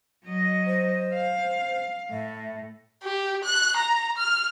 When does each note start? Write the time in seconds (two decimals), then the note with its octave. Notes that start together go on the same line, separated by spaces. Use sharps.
0.24 F#3 D#5
0.66 C5
1.13 F5
2.11 A2 E5
3.03 G4
3.44 F#6
3.77 A#5
4.17 F6